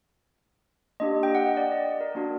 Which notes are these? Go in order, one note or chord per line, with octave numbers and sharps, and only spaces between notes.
A#3 D4 G4 D#5
G5
F#5
D#5
D5
D#5
D5
A#4
A#3 D4 F#4